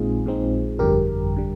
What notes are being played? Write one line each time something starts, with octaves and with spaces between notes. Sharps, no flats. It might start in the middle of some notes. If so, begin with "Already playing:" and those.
Already playing: A#1 A#2 G#3 C4 D#4 F4 G#4
A#1 A#2 G#3 C4 D#4
G1 F2 D3 G3 G4 A#4
D3 G3